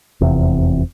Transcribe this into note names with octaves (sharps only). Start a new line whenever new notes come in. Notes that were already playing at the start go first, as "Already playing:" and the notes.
F1 E2 C3